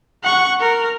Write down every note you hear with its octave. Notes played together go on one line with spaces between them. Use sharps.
F#5 C#6
A#4